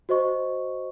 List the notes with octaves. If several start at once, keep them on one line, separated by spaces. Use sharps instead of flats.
F#4 C5 D#5 C#6